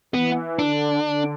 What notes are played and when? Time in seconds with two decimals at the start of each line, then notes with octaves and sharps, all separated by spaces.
0.14 E3 B3
0.59 D3 D4
1.03 D3